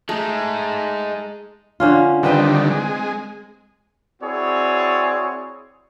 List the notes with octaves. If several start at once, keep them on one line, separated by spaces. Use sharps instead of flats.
G#3 A3 D#4
D3 C#4 F4
D3 D#3 G3 C4 B4 G5
G#3
C4 E4 F#4 G#4 C#5 D5